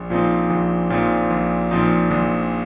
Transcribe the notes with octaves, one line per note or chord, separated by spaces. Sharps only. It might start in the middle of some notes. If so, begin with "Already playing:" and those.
Already playing: A#1
A#2 F3 C4 D#4
A#1
A#2 F3 C4 D#4
A#1
A#2 F3 C4 D#4
A#1